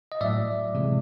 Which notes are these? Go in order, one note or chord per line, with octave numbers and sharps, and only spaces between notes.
D#5
A2 F#3 A3 D5 E5
C3 E3 G#3